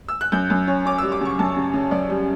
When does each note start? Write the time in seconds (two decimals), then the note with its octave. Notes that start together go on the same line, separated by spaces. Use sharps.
0.08 E6
0.21 F#6
0.32 F#2 G6
0.50 F#2
0.67 C#4
0.85 C#4 D6
0.98 E6
1.03 G3
1.12 D6
1.21 C#3 C#6
1.39 F#2 A5
1.56 C#3
1.73 C#3
1.91 F#2 D5
2.10 G3